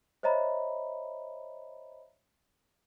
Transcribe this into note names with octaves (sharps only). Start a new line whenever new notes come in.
C5 C#5 D#5 E5 A#5 B5